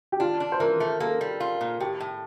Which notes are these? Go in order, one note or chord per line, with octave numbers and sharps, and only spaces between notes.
G4
D4 F4
D4
C5
E3 A#4
A3
A#3 A4
G3
F4
A#2
A2 G4
A2